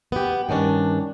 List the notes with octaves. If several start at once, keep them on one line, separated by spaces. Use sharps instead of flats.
B3 G4
G2 D#3 C#4 D4